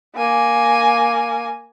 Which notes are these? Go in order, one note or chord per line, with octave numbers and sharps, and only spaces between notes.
A#3 G#5